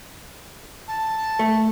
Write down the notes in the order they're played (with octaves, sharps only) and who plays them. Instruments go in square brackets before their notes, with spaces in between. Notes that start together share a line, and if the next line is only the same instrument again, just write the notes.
[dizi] A5
[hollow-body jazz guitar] A3